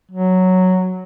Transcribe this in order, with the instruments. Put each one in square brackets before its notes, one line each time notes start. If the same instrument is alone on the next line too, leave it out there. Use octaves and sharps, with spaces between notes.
[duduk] F#3